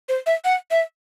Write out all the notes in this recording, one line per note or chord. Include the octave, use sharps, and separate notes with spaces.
C5
E5
F#5
E5